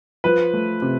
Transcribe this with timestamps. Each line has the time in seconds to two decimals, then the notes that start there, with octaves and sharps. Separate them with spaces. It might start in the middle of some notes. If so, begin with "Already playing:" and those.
0.24 F3 B4
0.53 A3
0.82 C3